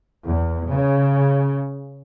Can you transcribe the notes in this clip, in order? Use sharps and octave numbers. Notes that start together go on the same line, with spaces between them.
E2
C#3